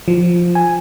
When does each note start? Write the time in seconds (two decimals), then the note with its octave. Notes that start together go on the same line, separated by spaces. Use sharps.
0.08 F3
0.55 G#5